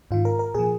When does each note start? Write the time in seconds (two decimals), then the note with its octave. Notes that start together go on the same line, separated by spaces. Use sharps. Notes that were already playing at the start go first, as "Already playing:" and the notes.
0.11 G#2 D#3 F4
0.25 A#4
0.39 A#4
0.55 A#2 F3 G#4